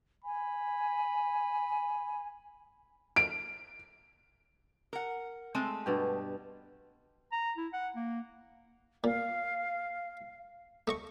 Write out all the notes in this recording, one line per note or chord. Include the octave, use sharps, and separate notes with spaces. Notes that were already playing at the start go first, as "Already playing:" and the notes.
G#5 B5
D7
A#4 F#5
G#3 A3 C4
G2 B2 G4
A#5
E4
F#5
A#3
A#2 F5
A3 D#5 C#6